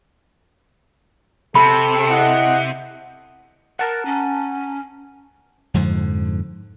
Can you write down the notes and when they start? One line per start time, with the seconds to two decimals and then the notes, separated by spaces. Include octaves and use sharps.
1.55 C3 A4 B5
2.10 E4 D#5 F#5
3.79 A#4 F#5 A5 A#5
4.05 C#4
5.74 F2 G#2 D3 F3